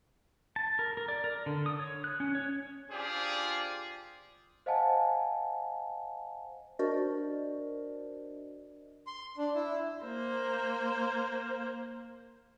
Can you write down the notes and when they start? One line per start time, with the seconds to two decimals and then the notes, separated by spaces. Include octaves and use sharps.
0.56 A5
0.79 A#4
0.97 A#4
1.08 D5
1.24 A#4
1.46 D3
1.66 D#6
1.80 C#5
2.04 F#6
2.20 C#4
2.35 C#5
2.91 D4 F4 G4 G#4 C5 D5
4.66 C5 D#5 F5 F#5 G#5 A5
6.79 D4 F#4 A#4 C5 D5 D#5
9.07 C6
9.37 D4
9.55 E4
10.03 A#3 C5